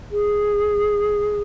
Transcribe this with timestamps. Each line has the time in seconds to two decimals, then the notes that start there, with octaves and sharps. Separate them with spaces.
0.11 G#4